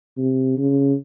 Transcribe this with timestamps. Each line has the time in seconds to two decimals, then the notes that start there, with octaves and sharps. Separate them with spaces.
0.17 C3
0.58 C#3